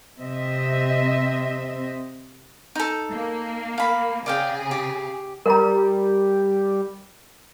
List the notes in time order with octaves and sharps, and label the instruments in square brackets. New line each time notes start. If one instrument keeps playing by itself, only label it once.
[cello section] C3 C4 D#5 E5
[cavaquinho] D#4 A4
[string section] A#3
[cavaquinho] F5 B5
[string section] C#3 G#4 [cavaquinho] D5 F5 G5
[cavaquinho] G4
[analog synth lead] G3 [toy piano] A#4 A#5